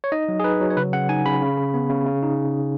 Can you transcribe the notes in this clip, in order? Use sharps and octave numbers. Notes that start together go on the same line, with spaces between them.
C#5
D#4 D#5
F#3
G#4
D#4 B4
F#3
C#5
C#3 B4
C#3 F#5
D#4 G#5
C#3 B5
C#3
C#3
B3
C#3
C#3
D#4